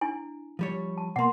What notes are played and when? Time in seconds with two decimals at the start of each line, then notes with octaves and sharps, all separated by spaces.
0.01 D4 E4 G#5
0.59 F3 G3 C#5
0.98 A5
1.16 B2 A#3 F#5 C6